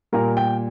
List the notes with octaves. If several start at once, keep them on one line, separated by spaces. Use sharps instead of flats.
A#2 G3 A#4
G5